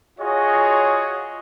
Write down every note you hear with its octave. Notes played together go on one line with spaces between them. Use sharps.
F4 F#4 G#4 C#5 D#5